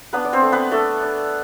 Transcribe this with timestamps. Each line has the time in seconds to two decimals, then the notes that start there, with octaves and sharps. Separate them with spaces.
0.13 B3 D4 B4
0.25 D5
0.33 C4 C5
0.42 A3
0.52 B3 B4
0.72 A3 D4 A4
1.02 D4